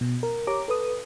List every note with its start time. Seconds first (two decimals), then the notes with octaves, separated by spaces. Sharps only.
0.01 B2
0.23 A#4
0.47 G4 C#5 A#5 D6
0.68 A4 B4 D#6